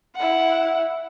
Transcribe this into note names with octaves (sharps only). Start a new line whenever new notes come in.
E4 F#5